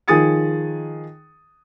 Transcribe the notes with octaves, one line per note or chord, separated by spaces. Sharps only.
D#3 F3 G#4 D#6 A6 C#7